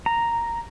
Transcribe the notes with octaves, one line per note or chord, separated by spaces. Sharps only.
A#5